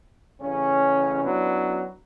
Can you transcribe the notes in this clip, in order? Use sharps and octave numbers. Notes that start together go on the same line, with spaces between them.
A1 C#3 C#4
F#3 B3 C#4 D4 E4